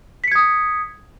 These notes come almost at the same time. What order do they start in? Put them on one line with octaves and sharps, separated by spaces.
B6 C#7 G#6 D#6